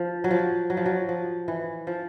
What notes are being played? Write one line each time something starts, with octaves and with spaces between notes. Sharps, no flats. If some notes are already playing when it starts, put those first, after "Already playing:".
Already playing: F3
F#3
F3
F#3
F3
F#3
F3
E3
F3